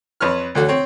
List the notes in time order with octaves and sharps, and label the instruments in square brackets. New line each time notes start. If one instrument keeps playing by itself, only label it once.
[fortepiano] F2 B4 C#5 F6
D2 D3 F#4 C#5
C4 C#5